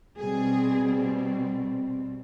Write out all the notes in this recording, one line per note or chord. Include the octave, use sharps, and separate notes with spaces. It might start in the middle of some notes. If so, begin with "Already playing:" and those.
B2 G3 C4 G#4